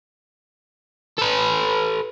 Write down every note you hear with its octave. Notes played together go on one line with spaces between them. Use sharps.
A4 B4